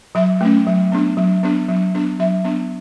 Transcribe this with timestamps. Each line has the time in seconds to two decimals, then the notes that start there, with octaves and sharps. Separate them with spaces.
0.15 F#3 E5
0.41 A3 C#4
0.67 F#3
0.92 B3 D4
1.17 F#3
1.43 B3 D4
1.69 F#3
1.95 B3 D4
2.19 F#3 E5
2.44 B3 D4